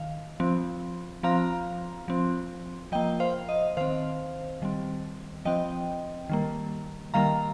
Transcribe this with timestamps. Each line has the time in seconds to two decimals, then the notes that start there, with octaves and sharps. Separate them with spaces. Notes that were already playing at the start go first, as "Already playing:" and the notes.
Already playing: D#3 F5
0.40 F3 C4
1.23 F3 C4 F5 A#5
2.08 F3 C4
2.92 F3 A#3 D#5 G5
3.20 C5 F5
3.49 D#5
3.77 D#3 C4 C5 F5
4.62 D#3 G3 C4
5.45 F3 C4 D#5 G5
6.29 D#3 G3 A#3
7.14 D#3 G3 A#3 F5 A#5